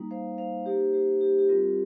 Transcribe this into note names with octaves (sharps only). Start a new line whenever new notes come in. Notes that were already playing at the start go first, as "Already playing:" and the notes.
Already playing: G3 A#3 D#4
C5 F5
C5 F5
A#3 D#4 G4 C5
G4 C5
G4
G4
G3 C4 F4 A#4